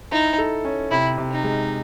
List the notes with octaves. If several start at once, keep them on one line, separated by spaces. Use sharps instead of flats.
D#4 E4
A4
C#4
C3 E4
C3
D#4
G#3